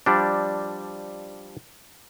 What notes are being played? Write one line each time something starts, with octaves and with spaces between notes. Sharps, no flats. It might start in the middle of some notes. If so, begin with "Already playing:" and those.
F3 G3 D4